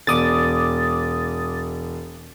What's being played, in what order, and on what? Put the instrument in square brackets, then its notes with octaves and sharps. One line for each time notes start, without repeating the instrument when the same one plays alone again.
[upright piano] E1 [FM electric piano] D6 D#6 A6